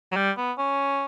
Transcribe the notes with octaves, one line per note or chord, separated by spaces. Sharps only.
F#3
G3
B3
C#4